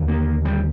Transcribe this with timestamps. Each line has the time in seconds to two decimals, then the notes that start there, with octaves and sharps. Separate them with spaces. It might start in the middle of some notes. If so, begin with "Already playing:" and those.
Already playing: D#2 D3
0.08 A#3
0.45 G3